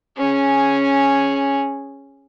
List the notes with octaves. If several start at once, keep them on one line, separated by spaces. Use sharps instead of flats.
C#4 G#4